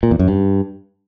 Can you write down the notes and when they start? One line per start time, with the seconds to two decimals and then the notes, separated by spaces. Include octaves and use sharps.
0.03 A#2
0.11 E2
0.19 F#2
0.28 G2